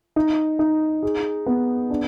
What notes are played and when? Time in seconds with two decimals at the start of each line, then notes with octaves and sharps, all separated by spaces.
0.16 D#4
0.59 D#4
1.02 G#4
1.46 B3
1.90 D4